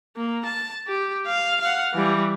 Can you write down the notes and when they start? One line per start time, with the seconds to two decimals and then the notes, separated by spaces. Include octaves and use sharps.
0.16 A#3
0.45 A5
0.88 G4
1.26 F5
1.61 F5 F#5
1.94 E3 G3